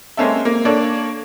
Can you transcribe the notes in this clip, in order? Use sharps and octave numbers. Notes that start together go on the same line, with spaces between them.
G#3 A#3 C4 C#4 A4 E5
A#3
A#3 D4 A4 C#5 D5